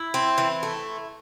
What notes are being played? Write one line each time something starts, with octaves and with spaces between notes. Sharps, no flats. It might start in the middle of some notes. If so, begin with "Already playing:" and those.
Already playing: E4
C4
E3
A3